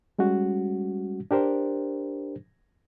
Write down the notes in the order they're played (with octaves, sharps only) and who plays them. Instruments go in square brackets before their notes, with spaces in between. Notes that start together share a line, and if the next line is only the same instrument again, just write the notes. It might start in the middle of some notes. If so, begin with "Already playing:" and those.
[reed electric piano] G3 G#3 C#4 F#4
D4 G4 A#4 C5